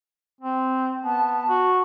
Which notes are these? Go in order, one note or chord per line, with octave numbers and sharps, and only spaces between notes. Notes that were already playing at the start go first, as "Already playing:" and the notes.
C4
B3 A5
F#4